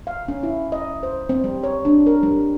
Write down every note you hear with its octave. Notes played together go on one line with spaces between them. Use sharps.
F5
C#4
E4
D#5
C5
C4
G3
C#5
D4
A#4
G3